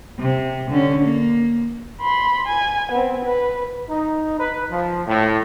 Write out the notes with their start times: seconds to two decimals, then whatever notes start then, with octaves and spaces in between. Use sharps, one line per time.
0.19 C3
0.70 D3 C#4
1.05 A#3
2.01 B5 C6
2.47 G#5
2.91 B3 C4
3.24 B4
3.90 D#4
4.40 B4
4.71 F3
5.07 A2